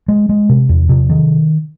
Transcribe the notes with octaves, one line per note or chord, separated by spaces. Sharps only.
G#3
G#3
C3
E2
C3
D#3